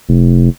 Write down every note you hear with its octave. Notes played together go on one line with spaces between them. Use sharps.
F1